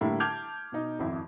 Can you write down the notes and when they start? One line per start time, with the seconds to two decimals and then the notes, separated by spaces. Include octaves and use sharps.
0.01 A2 D3 G3 A#3 E4 A#4
0.20 A5 D6 F6 G6 G#6 F7
0.72 B2 D#4
0.99 G#1 F2 E4